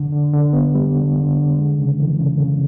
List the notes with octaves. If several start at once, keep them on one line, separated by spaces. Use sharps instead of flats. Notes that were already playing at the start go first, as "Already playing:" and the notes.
Already playing: D3
D3
D3
B3
G3
D3
D3
D3
G#3
C#3
E3
C#3
C#3